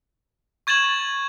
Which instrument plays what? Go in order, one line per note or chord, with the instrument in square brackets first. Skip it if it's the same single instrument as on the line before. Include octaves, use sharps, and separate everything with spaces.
[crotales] C#6 G#6 A6 E7 F#7